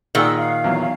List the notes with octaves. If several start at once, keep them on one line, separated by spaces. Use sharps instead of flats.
A#2 D#3 G#4 F#5 E6
F5
E2 E3 F#3